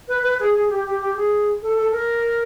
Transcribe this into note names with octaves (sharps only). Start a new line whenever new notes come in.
B4
B4
G#4
G#4
G4
G4
G4
G#4
A4
A4
A#4